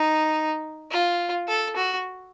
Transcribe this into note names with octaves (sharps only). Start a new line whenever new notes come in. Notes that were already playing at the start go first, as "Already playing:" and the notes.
Already playing: D#4
F4
A4
F#4